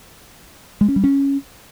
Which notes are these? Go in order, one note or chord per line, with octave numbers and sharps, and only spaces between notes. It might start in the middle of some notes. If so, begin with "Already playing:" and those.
G#3
C#4
G3
C#4